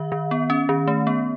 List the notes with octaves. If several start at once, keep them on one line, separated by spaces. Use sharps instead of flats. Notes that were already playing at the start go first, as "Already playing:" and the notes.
Already playing: D#3 E5
D#3
B3
C#4
D#3
A3
B3